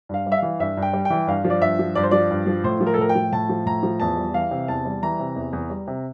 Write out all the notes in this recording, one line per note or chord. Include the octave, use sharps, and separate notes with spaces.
G2 F5
G3
E5
E3 F5
G2 E5
G2
G5
G3
G5
E3
G2 F5
F3
D5
G2 E5
F3
G2 D5
C5
F3 D5
G2
F3
A2 C5
F3
A#4
A4
A2 A#4
G5
F3
A2 A5
F3
A2 A#5
F3
E2 A5
G3
E3 F5
C3
E2 A5
G3
E3 A#5
C3
E2
E2
G3
C3